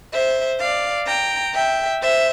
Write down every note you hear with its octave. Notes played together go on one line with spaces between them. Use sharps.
C5 E5
D5 F5
G5 A#5
E5 G5
C5 E5